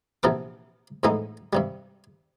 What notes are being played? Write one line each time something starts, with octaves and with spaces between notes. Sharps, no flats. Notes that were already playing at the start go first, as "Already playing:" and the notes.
A#1 C3 E3 B3 A#4 D6
F2 A2 E3 G#3 B3 D#4
G2 C3 G3